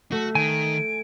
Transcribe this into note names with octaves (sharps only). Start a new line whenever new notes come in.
A3 F#4
D#3 G#5 D7